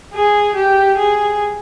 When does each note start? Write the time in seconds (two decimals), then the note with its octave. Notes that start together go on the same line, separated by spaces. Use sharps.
0.14 G#4
0.55 G4
0.98 G#4